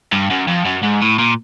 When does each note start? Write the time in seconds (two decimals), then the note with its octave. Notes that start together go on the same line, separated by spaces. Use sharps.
0.12 G2
0.31 F#2
0.48 F2
0.66 F#2
0.83 G#2
1.02 A2
1.19 A#2